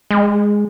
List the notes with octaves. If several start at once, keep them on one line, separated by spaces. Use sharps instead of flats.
G#3